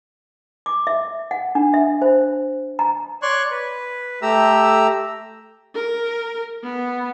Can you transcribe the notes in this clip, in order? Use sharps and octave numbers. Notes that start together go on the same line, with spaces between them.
D6
E5
F#5
D4
E5
C5
A#5
C#5 D5 C6 C#6 F#6
B4
A3 G4 A#5 E6
A#4
B3